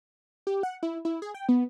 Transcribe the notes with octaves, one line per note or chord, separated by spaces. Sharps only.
G4
F#5
E4
E4
G#4
G5
B3